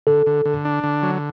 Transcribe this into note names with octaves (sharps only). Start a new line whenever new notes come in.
D3 A4
D3
D3
D4
D3
F#3